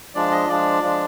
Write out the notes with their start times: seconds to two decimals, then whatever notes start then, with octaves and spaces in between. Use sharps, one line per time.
0.15 F3 G#3 D4 D5
0.32 D#5
0.48 F3 G#3 D4 D5
0.82 F3 G#3 D4